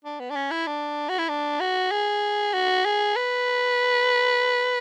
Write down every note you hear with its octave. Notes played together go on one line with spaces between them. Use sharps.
D4
B3
D4
C#4
E4
D4
F#4
E4
D4
F#4
G#4
F#4
G#4
B4